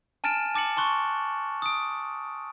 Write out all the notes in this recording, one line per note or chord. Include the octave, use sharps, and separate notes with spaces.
G#5 A5 F6 A6 D7 E7
A5 D6 A6 C#7 F#7
A5 C6 C#6 F#6
D#6 D7